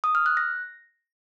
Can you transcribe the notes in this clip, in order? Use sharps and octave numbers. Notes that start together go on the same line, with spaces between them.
D#6
F6
F#6
A#6